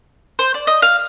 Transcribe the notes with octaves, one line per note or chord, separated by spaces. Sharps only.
C5
D5
D#5
F5